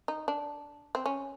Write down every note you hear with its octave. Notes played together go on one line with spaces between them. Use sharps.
D#4
D4
C4
C#4